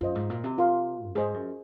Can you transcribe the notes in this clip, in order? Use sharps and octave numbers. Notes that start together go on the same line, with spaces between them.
F#2 F4 C5 D#5
G#2
A#2
C3
F4 A#4 F5 C6
F#2
G#2 G#4 C5 D#5
F#2